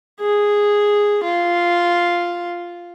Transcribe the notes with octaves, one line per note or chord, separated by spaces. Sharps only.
G#4
F4